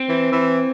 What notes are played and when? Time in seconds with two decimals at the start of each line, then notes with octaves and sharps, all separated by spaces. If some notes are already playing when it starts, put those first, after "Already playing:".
Already playing: C4
0.09 E3
0.32 E3